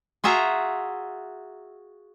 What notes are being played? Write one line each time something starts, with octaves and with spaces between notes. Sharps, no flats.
F4 F#4 G#4 E5 A#5